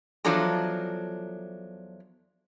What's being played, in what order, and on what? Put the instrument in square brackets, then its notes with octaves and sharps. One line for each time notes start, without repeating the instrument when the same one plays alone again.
[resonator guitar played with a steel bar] E2 F3 F#3 D4 A4 A#5